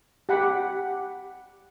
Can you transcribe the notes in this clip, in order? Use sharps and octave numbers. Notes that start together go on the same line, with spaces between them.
G4 F#5 B5